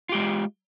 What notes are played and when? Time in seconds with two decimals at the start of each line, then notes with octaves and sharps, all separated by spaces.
0.09 F4
0.12 G4
0.14 G#3